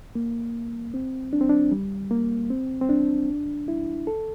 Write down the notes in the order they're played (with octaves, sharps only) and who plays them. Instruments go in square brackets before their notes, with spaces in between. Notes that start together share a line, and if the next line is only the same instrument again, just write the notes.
[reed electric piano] A#3
C4
D4
C4
D4
G3
A#3
C4
C4
D4
E4
A4